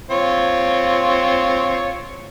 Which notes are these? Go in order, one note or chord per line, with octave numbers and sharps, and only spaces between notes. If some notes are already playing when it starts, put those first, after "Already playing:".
C4 F4 C#5